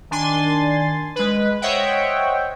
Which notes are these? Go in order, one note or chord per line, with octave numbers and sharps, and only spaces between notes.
D#3 D4 G#5 C6 A6
G#3 B4
C5 C#5 D#5 E5 F#5 G5